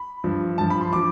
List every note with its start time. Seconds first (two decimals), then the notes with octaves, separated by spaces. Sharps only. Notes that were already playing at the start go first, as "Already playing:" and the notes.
Already playing: B5
0.24 G2 F3
0.58 G2 F3 A5
0.70 B5
0.81 C6
0.93 F3 D6